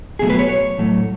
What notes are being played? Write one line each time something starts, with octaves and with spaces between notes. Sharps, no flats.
B1 B2 F#3 A3 G#4
B4
C#5
C#5
A2 F#3 A3